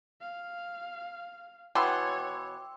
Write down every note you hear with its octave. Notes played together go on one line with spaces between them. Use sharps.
F5
B2 E3 B3 C#5 G5 C6 D6 E6